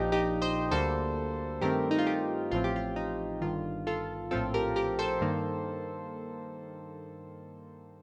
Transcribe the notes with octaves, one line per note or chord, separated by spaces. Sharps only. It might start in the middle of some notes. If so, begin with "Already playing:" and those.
Already playing: A#1 A#2 F3 D#4 G4
D#4 G4
C5 D#5
D2 D3 G3 A#3 A4 C5
G2 D#3 A3 C4 G4 A#4
D#4
F4
D#4 G4
A1 A2 F3 C4 F4
G4
F4
D#4
G1 G2 D#3 F4
F4 A4
A#1 A2 F3 C4 F4 A4
G4 A#4
G4 A#4
A4 C5
G2 D#3 A#3